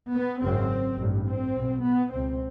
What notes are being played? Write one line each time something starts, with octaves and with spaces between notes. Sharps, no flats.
B3
G#1 F#2 C#3 C4
A1 G2
C4
B1 B2
B3
C#2 B2 C4